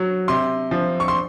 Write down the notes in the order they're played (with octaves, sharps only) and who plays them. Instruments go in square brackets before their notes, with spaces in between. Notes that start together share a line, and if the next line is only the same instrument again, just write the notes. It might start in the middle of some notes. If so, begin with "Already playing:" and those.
Already playing: [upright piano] F#3
C3 C6
F3
C#6
C6